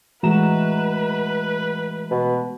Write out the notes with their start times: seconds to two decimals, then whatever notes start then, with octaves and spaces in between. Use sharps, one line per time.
0.23 E3 G#3 A3 F#4 B4 A#5 E7
2.11 B2